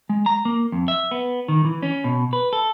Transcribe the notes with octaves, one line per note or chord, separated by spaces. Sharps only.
G#3
A#5
A#3
F2
E5
B3
D#3
E3
C#4
B2
B4
A4